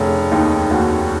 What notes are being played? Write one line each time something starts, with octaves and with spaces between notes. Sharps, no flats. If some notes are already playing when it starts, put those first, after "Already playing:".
Already playing: F1 C#3 C#4
D#2 D#4
D#2 F#4